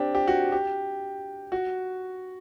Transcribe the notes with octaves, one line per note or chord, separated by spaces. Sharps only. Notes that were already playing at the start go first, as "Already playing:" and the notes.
Already playing: C4 D4 G4
G4
F#4
G4
F#4